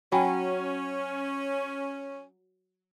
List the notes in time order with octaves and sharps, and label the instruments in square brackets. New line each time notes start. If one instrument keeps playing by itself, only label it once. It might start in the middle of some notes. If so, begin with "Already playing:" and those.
[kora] F#3 [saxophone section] C#4 [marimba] G5 G#5 B5